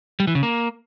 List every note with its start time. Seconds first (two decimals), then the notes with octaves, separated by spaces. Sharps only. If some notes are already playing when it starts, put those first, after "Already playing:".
0.20 G3
0.27 E3
0.35 C#3
0.43 A#3